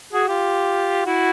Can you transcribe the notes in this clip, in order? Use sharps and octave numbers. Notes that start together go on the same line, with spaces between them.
F#4 G#4
F4 G4
E4 F#4